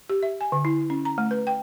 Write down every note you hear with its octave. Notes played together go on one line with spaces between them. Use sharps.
G4
E5
G#5
D3
E4
C#4
A#5
A3
B4
G5